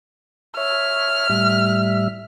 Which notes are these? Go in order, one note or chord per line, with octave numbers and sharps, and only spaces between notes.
C#5 E5 F6
A2 G3 E5